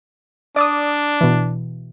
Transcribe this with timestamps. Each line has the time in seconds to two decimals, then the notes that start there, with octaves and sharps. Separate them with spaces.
0.56 D4 D5 D6 D#6
1.21 B2 E3